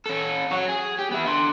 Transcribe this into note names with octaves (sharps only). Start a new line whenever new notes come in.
C#4 A4
F#4 C#5
G#4
G4
B3 E4
D3 C6